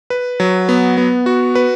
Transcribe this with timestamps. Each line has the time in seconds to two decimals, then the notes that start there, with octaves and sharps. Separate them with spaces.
0.10 B4
0.40 F#3
0.69 B3
0.97 B3
1.26 F#4
1.55 B4